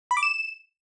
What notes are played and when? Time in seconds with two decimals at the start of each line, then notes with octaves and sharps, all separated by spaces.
0.11 B5
0.17 D6
0.23 E7